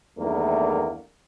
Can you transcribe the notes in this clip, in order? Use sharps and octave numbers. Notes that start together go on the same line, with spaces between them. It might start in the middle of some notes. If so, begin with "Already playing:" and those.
E2 G2 D#3 A3 A#3